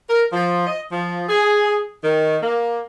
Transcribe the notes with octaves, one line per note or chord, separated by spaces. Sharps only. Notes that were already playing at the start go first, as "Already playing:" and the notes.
A#4
F3
D#5
F3
G#4
D#3
A#3